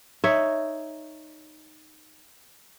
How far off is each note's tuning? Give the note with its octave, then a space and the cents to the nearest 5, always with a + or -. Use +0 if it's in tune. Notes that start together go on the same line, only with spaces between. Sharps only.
D#4 -5 C#5 +0 E5 +0